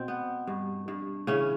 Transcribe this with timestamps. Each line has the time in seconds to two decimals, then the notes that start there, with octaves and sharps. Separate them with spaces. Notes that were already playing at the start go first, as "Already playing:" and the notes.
Already playing: B2 C4
0.08 B3
0.47 G2
0.88 G2
1.27 C#3 E3 C#4